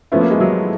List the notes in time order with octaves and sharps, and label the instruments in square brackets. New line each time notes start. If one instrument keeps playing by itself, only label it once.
[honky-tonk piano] F3 A3 C#4 E4 [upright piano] B3
[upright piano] A#3
G#3
F#3